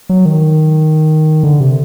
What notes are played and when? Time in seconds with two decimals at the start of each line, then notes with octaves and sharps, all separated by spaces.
0.09 F#3
0.25 D#3
1.43 D3
1.60 C3